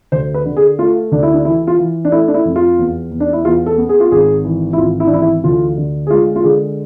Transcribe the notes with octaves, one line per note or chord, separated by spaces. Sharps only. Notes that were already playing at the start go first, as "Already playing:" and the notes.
D2 C5
B4
D3
G#4
A3 F4
D2 D4
E4
D4
E3 E4
F4
E3
D4
A3 E4
D4
E4
F2
F4
E2
E2
D4
E4
E2 F4
A4
B3
G#4
F4
G#1 G#4
E3
E4
G#1 F4
E4
D4
E3 E4
E4
D2 F4
D3
G#4
G#3 F4
F4
D3 G#4